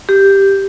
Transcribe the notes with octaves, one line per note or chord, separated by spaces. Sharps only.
G4